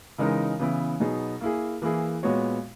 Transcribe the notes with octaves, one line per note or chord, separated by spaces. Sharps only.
C#3 E3 G#3 D#4 A#4
C#3 E3 B3 E4
B2 F#3 B3 D#4 G#4
A#3 E4 G#4
E3 A#3 E4 G#4
A#2 G#3 B3 F#4 C#5